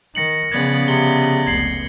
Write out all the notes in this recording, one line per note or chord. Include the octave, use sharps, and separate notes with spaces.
D#3 A#6 C#7 F#7
C#3 F3 B3 D5 G#6
C3 C#7 G7
F1 C#2 G#6 C7 F#7